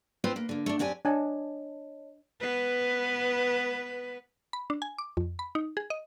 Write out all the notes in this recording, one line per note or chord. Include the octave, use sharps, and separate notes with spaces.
C4 F4 B4 C5
A#3
D3 A#3
A3 D4
F#2 C4 D4 G4 G#5
D4 C#5 D#5 G#5 A5
B3 B4
B5
D4
G#5
D6
F2
B5
D#4
G#4
D#5